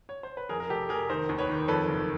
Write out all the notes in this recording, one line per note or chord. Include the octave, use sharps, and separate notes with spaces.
C#5
C5
B4
F2 G#4 A#4
A#4
F1 G4 A4
F1 G#4 A#4
D#3 A#4 C5
D#2
B4 C#5
D#3
F2 A4 B4
F#1